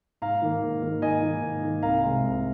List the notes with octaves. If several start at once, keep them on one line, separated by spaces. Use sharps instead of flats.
G#2 F5 A#5
D#3 A#3
G#2
D#3 A#3
G#2 D#5 G#5
D#3 A#3
G#2
D#3 A#3
C2 F5 A#5
C3 G#3
C2